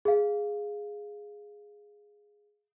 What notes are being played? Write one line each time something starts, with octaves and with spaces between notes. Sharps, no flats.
G#4 F5